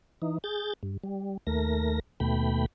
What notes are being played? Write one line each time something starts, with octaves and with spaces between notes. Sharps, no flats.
E3 D#4
G#4 G6 A6
G2
G3
D#2 A3 A#4 A#6
D#2 B2 A3 G5 B5